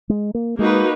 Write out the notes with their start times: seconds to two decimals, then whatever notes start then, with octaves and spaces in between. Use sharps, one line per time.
0.09 G#3
0.34 A#3
0.59 G#3 A#3 D#4 F#4 B4